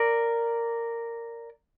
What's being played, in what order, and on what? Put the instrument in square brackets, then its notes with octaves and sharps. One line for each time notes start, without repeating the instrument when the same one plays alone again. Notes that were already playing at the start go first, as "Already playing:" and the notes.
Already playing: [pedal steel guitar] A#4 D5